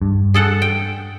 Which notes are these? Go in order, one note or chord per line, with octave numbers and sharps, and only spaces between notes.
G2
G#4 A4 F#5
G5